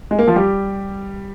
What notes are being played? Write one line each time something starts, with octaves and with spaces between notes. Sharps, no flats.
G#3
A#3
F3 F4
G3 G4